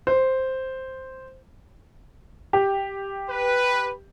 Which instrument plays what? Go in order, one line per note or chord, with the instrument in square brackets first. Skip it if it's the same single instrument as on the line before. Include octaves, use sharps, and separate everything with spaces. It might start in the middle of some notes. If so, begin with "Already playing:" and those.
[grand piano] C5
[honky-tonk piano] G4
[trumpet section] B4